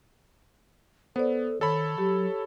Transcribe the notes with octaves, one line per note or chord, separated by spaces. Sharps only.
B3 A4 C5 D5
D#3 A4 C#5 B5
F#3 G4